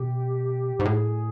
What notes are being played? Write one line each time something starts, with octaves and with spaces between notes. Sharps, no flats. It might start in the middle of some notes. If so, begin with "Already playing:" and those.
Already playing: B2 G4
G#2
A2 G#4